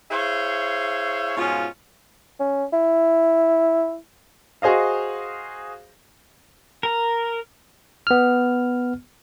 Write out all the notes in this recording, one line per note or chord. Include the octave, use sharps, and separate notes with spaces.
E4 G#4 C5 C#5 E5 F5
G#2 B2 G#3 C#4 F4
C#4
E4
F#4 G#4 C5 D#5 F5
A#4
B3 F6